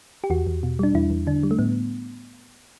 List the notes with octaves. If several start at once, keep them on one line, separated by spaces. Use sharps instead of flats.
G4
E2 F#4
E2
B2
G3 D4
E2 E4
E2
D3 D4
G3
A3
A2 B3